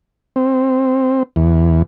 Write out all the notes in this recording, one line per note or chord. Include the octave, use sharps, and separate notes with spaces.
C4
E2